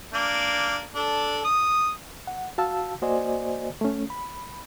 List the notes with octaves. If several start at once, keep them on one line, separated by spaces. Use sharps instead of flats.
A#3 D4
D4 A4
D#6
F#5
F#4 F5 A5 E6
A#3 F#4 C5 D5 D#5 G#5
A3 C#4
B5